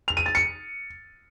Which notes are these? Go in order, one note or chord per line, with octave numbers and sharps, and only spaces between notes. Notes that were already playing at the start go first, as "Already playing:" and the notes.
F7
D#7
A6
C#7